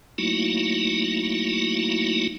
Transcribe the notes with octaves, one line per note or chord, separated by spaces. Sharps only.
F#3 A3 A#3 D#4 E4 F#4